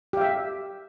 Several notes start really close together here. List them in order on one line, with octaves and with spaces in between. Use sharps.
G4 F5 E5